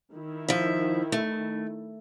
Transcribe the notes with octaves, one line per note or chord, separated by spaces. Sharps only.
D#3 E4
F3 E5
A3